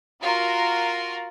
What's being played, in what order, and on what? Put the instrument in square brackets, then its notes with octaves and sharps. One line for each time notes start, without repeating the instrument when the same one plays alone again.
[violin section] F4 F#4 A#4